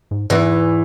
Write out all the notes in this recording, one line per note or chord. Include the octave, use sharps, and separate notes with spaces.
G#2
E2 G#2 E3